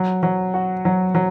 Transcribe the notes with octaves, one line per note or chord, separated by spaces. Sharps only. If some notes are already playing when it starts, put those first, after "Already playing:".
Already playing: F#3
F#3
F#4
F#3
F#3